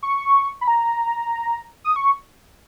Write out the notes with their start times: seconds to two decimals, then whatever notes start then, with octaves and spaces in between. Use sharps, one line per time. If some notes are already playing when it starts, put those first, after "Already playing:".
0.03 C#6
0.61 B5
0.68 A#5
1.84 D#6
1.96 C#6